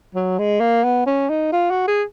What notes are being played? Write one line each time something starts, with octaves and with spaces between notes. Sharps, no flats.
F#3
G#3
A#3
B3
C#4
D#4
F4
F#4
G#4